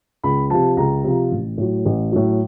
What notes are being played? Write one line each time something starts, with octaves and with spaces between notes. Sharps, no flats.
C#2 B5
C3 F3 A5
C#2 A#5
C3 F3
A1
A2 F#3
A1
A2 F#3